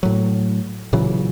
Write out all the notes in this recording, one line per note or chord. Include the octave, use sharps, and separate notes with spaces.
A2 F#3
A#2 C#3 E3 F#3